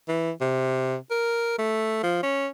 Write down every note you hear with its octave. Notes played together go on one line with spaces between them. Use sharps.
E3
C3
A#4
A3
F3
C#4